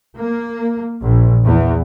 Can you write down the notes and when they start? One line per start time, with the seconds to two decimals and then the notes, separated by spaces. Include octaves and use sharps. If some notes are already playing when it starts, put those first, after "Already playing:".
0.17 A#3
1.01 A#1
1.43 E2